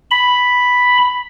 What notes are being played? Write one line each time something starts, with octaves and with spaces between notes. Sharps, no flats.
B5